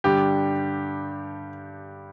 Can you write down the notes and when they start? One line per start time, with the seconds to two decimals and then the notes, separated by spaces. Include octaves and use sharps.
0.04 G2 D3 G3 G4